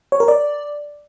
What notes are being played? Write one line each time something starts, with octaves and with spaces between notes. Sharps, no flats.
C#5
A#4
D5